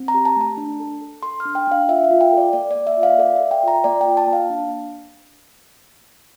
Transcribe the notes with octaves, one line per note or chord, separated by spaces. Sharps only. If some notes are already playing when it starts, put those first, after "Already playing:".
Already playing: C4
A#5
G4
A5
A3 A5
D4
A4
A4
A4 C6
F6
D4
G5
D4 F5
F4 E5
F5
F4
G5
A4 D5
A#3 D5
D5
A#3
E5
F4
F5
A4 D5
E5
A4
G5
F4 A#5
A#3 D5
G5
F4
A5
A#3
F5
D4